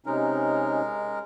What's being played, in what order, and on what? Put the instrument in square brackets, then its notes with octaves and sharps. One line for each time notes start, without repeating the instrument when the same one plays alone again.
[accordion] C3 C#4 D#4 [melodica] G#3 A#4